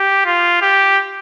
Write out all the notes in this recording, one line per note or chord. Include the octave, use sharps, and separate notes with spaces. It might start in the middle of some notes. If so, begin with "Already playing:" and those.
Already playing: G4
F4
G4